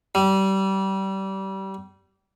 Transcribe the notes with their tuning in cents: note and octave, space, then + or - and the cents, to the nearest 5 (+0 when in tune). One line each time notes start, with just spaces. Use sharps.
G3 -25